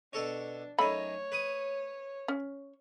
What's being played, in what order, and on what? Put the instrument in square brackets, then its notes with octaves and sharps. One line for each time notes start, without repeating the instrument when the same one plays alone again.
[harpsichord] B2 A4 C#5 [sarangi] D4
[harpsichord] F#2 D#4 [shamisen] A3 B5 [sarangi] C#5
[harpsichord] B4 D#6
[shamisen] C#4